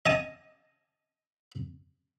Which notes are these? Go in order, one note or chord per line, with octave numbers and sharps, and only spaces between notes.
D#5 G#5 A5 D#6